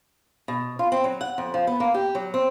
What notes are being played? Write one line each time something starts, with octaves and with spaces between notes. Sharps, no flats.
B2
F4
C4
F#3
F#5
F2
F3
B3
A#3
G4
F#3
C4